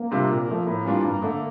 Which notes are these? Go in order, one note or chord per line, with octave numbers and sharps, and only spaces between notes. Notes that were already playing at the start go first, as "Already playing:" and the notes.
Already playing: A#3
C3 G3 D4 F4
A#2
F3 A3
A2 A#3
E3 G3 D4 F4
G2
D3 A3